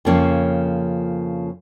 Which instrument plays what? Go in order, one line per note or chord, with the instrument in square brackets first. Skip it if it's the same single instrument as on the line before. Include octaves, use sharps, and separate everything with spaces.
[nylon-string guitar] F2 C#3 F3 A#3 C#4